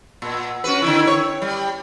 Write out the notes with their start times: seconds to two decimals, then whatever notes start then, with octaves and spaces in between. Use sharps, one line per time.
0.22 A#2
0.64 C#4 F#4 B4
0.82 D3 D#3 E4
1.07 C#5
1.42 G3